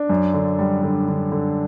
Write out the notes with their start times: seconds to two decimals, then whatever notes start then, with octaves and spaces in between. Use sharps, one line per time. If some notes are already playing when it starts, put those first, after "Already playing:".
Already playing: D4
0.09 F#2
0.34 D3
0.59 G3
0.83 D3
1.08 D3
1.32 D3